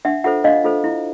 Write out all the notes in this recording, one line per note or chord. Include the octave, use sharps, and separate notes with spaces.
D4 E5 F#5
F4 A4 C5 E5 F#5
D4 D#5 F5
F4 A4 C5
E4